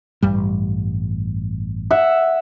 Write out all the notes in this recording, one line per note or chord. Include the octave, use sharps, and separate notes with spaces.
A1 G2 G3
E5 F#5